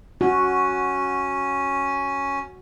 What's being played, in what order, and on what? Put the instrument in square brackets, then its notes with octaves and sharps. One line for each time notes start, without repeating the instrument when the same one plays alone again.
[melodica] C#4 [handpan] F#4